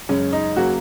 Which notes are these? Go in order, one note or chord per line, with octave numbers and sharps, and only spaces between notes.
F#2 C#3 G#3 C#4
D#4
C#3 F#3 A#3 F#4